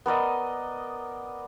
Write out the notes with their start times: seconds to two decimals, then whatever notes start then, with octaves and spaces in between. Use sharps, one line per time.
0.06 B3 A#4 D5 D#5